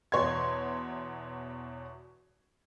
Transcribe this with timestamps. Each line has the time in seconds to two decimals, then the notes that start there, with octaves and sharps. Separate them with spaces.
0.12 E2 B2 C#5 C6 G#6